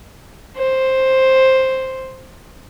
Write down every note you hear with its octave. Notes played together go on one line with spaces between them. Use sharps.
C5